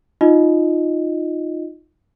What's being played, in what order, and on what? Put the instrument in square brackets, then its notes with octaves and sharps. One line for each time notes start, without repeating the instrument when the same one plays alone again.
[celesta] D#4 F4 D#5